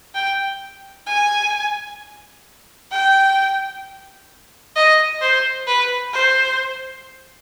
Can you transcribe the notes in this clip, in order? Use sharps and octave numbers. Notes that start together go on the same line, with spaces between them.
G5
G#5
G5
D#5
C5
B4
C5